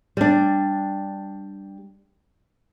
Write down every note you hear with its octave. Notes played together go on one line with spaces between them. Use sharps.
G3 D4